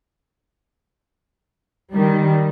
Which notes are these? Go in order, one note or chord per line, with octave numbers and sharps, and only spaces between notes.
D#3 G3